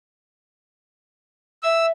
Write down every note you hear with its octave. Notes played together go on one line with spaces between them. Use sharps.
E5 E6